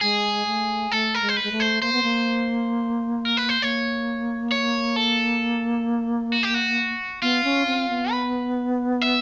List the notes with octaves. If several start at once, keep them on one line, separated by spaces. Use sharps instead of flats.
G#3 G#4
A3
A3 A4
A#4
G#3
C5
B4
G#3
A3
C5
A#3 C5
B3
A#3
A#4
B4
C5
A#3 C#5
C#5
A4
F#4
G4
F#4
B3 F4
C#4
C4
B3
B4
E5